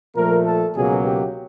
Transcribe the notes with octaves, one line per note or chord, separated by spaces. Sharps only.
A#2 F3 A3 A#4
A4
C#2 B2 F#3 A#3 G#4
G4